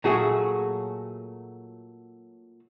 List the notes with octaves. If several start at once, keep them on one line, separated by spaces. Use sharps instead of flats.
A#2 F#3 A3 F#4 G#4